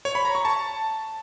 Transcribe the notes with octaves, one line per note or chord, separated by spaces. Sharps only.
C#5
B5
A#5
C#6
A5